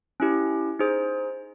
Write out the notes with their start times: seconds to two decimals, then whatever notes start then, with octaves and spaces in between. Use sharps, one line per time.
0.20 C#4 E4 G4
0.79 D#4 G#4 C5